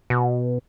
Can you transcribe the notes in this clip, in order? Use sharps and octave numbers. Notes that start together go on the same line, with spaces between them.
B2